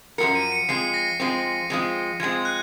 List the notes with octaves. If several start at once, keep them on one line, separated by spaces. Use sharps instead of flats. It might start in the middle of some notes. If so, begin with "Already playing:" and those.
F#2 F3 C4 F#4 A#4 C#7
D#7
C#7
F3 G#3 C4 C7
A#6
F3 G#3 C4
F3 G#3 C4
F3 G#3 C4 G#6
F#6